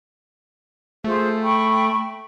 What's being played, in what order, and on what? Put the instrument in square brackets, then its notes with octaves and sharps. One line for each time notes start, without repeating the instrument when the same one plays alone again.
[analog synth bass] A3 [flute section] F4 G#4 C5
[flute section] G5 B5 C#6